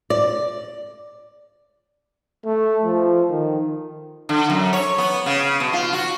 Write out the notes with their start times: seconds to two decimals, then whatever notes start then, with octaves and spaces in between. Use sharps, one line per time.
0.10 D5
2.45 A3
2.85 F3
3.31 D#3
4.29 D3
4.50 F#2
4.73 C#5
4.98 B3
5.26 C#3
5.60 B2
5.73 F4
5.93 F#4